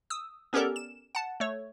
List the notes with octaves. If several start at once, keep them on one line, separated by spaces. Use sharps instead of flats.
D#6 E6
B3 C#4 G4 A4 A#4 D5
E7
F#5 A5
A3 C#5